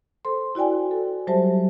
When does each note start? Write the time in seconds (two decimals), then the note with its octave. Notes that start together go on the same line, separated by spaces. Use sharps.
0.25 A4 C5 C6
0.55 E4 F#4 D5 G5 G#5
0.91 A4
1.27 F#3 G3 G4 C5 E5 A5